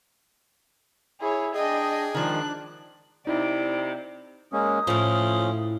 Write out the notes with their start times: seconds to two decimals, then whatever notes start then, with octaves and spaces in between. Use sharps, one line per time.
1.21 E4 G#4 C#5
1.55 D4 G#4 D#5 G5
2.14 D#3 F3 G#3 D4 D5 F#6
3.27 C3 D#4 E4 D5
4.53 G#3 A#3 C#4 D#6
4.87 A2 F3 C#4 E4